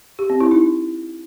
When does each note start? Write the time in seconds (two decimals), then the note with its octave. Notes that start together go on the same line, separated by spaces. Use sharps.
0.19 G4
0.30 C4
0.40 E4
0.51 D#4